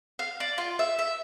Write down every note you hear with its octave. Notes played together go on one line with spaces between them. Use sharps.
F5
D5
F4
E5
E5